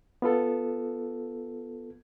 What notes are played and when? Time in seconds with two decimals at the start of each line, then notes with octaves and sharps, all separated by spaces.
0.22 B3 F4 A4